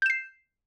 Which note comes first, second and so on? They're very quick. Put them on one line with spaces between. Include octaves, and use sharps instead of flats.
G6 E7 C7